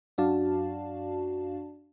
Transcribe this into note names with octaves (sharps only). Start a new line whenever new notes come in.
F#2 D4 F#4 D5 F5 A5